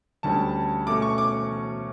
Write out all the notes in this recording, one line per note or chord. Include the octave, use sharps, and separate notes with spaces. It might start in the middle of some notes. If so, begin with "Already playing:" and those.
D2 D3 G3 C#4 A5
B2 A3 C#4 D6
C#6
D6